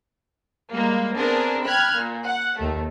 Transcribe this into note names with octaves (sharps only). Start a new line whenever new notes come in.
G3 G#3 A#3
B3 C4 D4 G#4 A#4
G5 B5 F6 F#6 G#6
A#2
F#5
D#2 D#3 A3